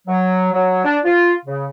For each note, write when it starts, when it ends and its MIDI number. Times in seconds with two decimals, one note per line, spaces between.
0.07 0.53 54
0.53 0.83 54
0.85 0.98 62
1.05 1.33 65
1.46 1.66 49